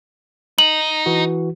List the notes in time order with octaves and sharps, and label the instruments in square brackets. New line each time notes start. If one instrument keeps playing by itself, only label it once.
[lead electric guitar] D#4 [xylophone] F#7
[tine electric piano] E3 F#4